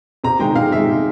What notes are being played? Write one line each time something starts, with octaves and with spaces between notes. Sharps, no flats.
C3 A#5
D#3 G#3 G5
C3 F5
D#3 G#3 E5
C3